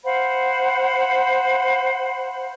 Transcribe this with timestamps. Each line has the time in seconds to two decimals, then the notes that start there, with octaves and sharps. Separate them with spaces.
0.05 C5 F5 F#5 B5